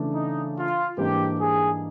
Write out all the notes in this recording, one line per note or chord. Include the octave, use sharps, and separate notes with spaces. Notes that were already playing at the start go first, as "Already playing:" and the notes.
Already playing: C#3 E3 A3 D4
D#4
F4
G#2 E3 G3 A#3 D4 G4
G#4